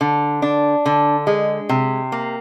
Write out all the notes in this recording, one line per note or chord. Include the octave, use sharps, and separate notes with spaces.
D3
D4
D3
G#3
C3
A#3